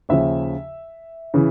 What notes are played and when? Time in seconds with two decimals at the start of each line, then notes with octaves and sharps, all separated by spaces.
0.09 D#2 C#3 F3 E5
1.34 C#3 E3